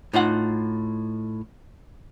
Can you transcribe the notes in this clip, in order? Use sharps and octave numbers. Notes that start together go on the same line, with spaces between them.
A2 D#4 F4 F#5